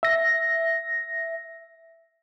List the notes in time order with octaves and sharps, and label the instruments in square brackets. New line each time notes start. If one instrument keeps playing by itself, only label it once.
[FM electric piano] E5 A#6